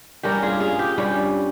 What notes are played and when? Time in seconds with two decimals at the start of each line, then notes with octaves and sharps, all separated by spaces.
0.23 G2 G3 C#4 G4 A#4
0.43 F4 G#4
0.60 F4 G#4
0.79 G4
0.98 G2 G3 C#4 G4